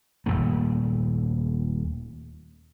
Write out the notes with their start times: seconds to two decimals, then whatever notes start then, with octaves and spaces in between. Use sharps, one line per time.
0.26 D#1 E2 A#2 A3